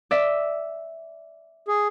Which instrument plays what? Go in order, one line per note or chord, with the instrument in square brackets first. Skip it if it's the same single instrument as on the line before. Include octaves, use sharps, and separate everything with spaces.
[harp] D5 E5 B6
[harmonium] G#4